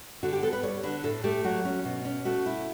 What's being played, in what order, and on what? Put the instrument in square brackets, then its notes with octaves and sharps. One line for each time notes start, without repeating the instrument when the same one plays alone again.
[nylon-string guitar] D3 F#4
G4
B3 A4
B4
G3 C#5
D3 B4
A2 A4
A3 G4
F#3 F#4
C#4
B2
C#4
A3 F#4
E4